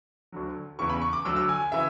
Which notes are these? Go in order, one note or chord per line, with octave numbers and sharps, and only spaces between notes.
D2 D3 F#3
E2 C#3 E3 C#6
B5
C#6
D6
D2 D3 F#3 E6
E6
G#5
C#3 E3 E5